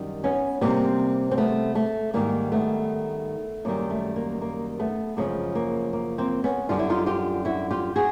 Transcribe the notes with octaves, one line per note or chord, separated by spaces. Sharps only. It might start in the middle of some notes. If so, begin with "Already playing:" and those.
Already playing: F#2 D#3 G3
B3 C#4
C3 E3 G3 A#3 C4
C4
A3 B3
A3
G#2 D#3 G3 A#3
A3 B3
F#2 D#3 G3 A#3
A3
A#3
A#3
A3 B3
F#2 C#3 F3 G#3 A#3
A#3
A#3
A#3 C4
B3 C#4
F#2 D3 G3 F4
E4
D#4 F4
F4 G4
E4 F#4
F4 G4
F#4 G#4